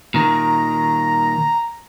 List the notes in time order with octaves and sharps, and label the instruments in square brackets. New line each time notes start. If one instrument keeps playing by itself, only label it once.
[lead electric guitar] A#2 D#3 [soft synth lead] A#5